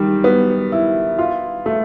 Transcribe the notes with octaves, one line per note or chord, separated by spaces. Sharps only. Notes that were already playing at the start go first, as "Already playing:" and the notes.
Already playing: D#3 G3
B3
E4
F4
A3